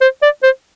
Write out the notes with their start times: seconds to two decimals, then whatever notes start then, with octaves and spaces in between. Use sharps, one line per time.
0.01 C5
0.22 D5
0.43 C5